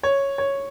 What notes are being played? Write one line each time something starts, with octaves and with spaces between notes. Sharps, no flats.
C#5
C#5